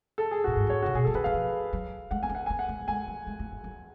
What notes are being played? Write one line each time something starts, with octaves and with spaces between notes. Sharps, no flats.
A4
G#4
A2 F#4
G#2
F#3
C#5
C#3 F#4
B2 G#4
F#3 A4
F3 B4
F#3 F5
F3
F#3
G#3 F#5
B3 G#5
C#4
F#5
B3 G#5
F#5
A3
F#3
G#3 G#5
F#3
G#3
A3
G#3
F#3